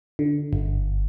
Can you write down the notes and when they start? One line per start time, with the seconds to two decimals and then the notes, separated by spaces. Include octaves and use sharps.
0.19 D3
0.53 G1